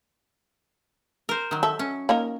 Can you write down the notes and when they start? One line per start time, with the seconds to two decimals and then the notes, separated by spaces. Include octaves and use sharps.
1.29 A#4 C5
1.51 D#3 F#3
1.63 A4 E5
1.79 C#4
2.09 A#3 D#4 A#4